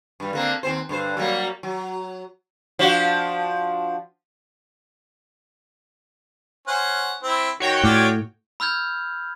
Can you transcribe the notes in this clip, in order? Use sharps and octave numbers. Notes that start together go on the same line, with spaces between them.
G2 G3
D3 A#3 C4
D#2 C4 C5
G2 D3 C5
F#3 G3 A#3
F#3
F3 D4 F#4
C#4 C5 F#5
C4 E4
D#3 F#4 C#5 G5
A2 D4 F4 G4
B5 E6 F6 G6 G#6